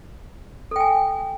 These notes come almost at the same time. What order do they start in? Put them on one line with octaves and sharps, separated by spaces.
A4 G5 G#5